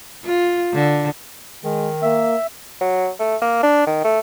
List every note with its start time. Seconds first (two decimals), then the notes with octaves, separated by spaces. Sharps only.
0.25 F4
0.74 D3
1.64 D#3 G#3
2.03 A#3 E5
2.81 F#3
3.19 A3
3.42 A#3
3.63 D4
3.87 D#3
4.04 A3